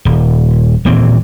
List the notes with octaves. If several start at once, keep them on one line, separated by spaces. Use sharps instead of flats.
D#1
D#1 A#2 E3 C4